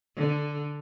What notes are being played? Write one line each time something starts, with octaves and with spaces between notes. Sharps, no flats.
D3